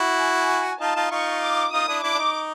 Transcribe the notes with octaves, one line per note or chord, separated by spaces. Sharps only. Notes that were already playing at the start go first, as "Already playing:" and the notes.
Already playing: E4 F#4
G#5
D#4 F4 A5
D#4 F4
D#4 F4 C#6
D6
D#4 F4 D#6
D4 E4
D4 E4 D6
D4
D#4